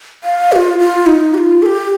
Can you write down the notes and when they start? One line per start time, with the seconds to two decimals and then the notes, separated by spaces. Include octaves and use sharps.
0.24 F5
0.52 G4
0.56 F4
0.79 F4
1.07 D#4
1.34 G4
1.38 F4
1.63 A4
1.66 G4